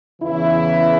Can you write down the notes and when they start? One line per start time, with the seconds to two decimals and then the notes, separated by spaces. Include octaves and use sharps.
0.21 E2 C#3 E3 E4